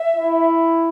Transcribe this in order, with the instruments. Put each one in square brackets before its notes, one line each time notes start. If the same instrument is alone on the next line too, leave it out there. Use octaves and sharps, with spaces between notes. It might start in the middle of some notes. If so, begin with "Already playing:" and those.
Already playing: [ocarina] E5
[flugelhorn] E4